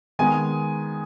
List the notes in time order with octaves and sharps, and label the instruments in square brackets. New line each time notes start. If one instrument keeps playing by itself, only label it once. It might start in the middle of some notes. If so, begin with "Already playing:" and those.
[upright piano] D#3 G#3 B3 G#5